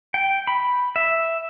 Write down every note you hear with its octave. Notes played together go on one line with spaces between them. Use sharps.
G5
B5
E5